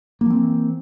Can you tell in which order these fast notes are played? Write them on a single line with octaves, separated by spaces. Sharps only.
A#3 F3 C4 E3